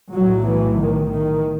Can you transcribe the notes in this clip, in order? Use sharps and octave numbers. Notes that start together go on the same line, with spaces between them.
B1 A2 F#3
E3
D#3
D#3